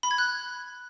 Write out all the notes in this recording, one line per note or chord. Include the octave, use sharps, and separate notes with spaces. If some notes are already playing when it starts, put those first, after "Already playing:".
B5
G#6
F#6